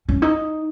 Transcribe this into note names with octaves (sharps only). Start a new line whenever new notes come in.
C#4
D#4